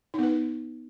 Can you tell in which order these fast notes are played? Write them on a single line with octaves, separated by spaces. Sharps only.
D#4 B3 B4